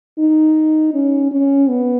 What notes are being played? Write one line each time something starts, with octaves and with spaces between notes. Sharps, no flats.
D#4
C#4
C#4
B3